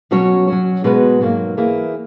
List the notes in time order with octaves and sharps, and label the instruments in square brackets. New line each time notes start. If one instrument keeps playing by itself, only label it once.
[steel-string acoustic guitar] B2 F#3 C#4 F#4 C#5
F#3 C#4 F#4
B2 G#3 B3 F#4 B4
G#2 F#3 A#3
E3 A#3 E4 G#4